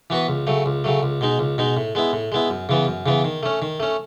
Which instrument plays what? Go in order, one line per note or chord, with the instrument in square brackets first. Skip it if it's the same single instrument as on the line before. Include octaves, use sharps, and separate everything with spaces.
[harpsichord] E3 B3 F#4 B4
C#2
C#3 F#3 A3
C#2
C#3 F#3 A3
C#2
B2 G#3 D#4
C#2
B2 G#3 D#4
A2
G#3 B3 E4
A2
G#3 B3 E4
F#2
C#3 E3 B3
F#2
C#3 E3 B3
D#3
A3 C#4
D#3
A3 C#4